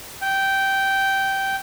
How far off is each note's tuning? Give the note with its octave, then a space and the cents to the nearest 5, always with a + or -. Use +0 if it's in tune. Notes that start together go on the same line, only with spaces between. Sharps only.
G5 -10